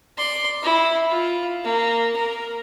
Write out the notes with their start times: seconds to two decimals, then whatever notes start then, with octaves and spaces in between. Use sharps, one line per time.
0.18 D5 C6
0.63 E4
1.10 F4
1.64 A#3
2.16 A#4